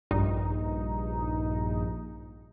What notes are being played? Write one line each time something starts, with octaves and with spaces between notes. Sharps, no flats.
A#1 G2 D#4